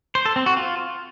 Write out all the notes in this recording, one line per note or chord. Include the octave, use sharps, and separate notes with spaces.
C5
A4
C4
F#4
F4